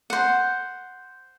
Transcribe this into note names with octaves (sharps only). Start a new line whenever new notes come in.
C5 F#5